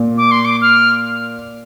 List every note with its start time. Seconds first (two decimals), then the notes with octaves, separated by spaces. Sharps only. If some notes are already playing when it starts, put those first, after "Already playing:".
Already playing: A#2
0.18 D6
0.31 C6
0.45 D6
0.61 F6